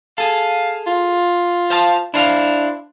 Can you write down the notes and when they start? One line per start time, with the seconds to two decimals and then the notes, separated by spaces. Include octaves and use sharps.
0.18 G#4 A4 F5
0.87 F4
1.70 C5 F5 A5
2.14 D4 E4 C5 F5